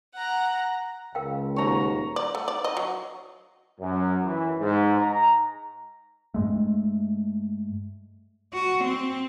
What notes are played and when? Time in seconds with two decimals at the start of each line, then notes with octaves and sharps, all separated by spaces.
0.14 F#5 A#5
1.15 C#2 A#4 F5 G5
1.56 D#1 C#5 A#5
2.16 D5
2.35 A3
2.48 D5
2.64 D#5
2.77 F#3
3.80 F#2
4.24 E3
4.59 G#2
4.99 A#5
6.34 G2 G#3 A3
8.53 F#4
8.85 C4